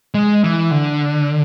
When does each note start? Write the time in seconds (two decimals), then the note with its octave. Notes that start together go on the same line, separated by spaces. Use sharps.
0.14 G#3
0.44 E3
0.71 D3